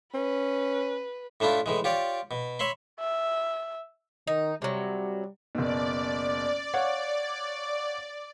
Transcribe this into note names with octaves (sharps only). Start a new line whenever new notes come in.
C#4 B4
A2 A3 D4 E4 F4
A2 E3 G#3
F4 G4 C#5 D5
B2
C#5 E5 B5 C6
E5
D#3 D#4
C3 F#3 G3
F#1 B2 D5
C#5 F5 F#5